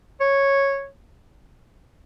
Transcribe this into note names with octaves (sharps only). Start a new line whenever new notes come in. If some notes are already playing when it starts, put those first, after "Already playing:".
C#5